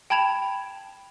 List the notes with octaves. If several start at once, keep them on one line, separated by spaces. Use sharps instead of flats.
G5 A5 B5 G#6 E7 F7